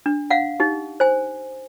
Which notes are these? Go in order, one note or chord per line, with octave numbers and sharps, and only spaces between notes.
D4
F5 F#5
D#4 G4
C5 G#5